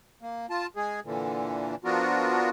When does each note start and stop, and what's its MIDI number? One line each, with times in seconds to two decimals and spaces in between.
0.22 0.46 58
0.50 0.67 65
0.50 0.67 81
0.76 1.00 56
0.76 1.00 68
1.04 1.75 46
1.04 1.75 50
1.04 1.75 52
1.85 2.50 53
1.85 2.50 59
1.85 2.50 62
1.85 2.50 65
1.85 2.50 66
1.85 2.50 70